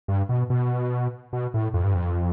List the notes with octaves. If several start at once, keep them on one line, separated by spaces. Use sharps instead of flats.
G2
B2
B2
B2
A2
F2
G2
F2